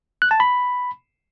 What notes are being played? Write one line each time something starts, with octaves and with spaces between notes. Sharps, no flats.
F#6
A5
B5